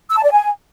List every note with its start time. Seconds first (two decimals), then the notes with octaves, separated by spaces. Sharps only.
0.09 E6
0.17 A5
0.24 D5
0.31 G#5